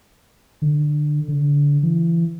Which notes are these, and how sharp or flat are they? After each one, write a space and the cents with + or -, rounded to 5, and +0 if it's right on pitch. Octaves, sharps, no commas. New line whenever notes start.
D3 +20
D3 -25
E3 +30